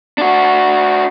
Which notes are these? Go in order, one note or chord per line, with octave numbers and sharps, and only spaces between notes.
D4 F#4